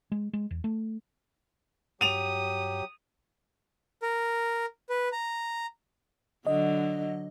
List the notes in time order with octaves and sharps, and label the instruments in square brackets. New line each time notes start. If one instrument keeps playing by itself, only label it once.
[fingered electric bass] G#3
G#3
E2
A3
[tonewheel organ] G2 [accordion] F#3 G4 [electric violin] D#6 [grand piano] D#7 F7
[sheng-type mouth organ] A#4
B4
A#5
[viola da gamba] D3 F#3 [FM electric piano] D#5